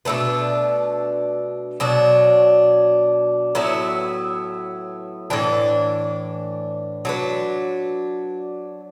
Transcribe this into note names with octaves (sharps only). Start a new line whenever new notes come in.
B2 A3 D4 B4
B2 F#3 D4
A2 F#3 B3 E4
A2 E3 D4 B4
F#3 D4 B4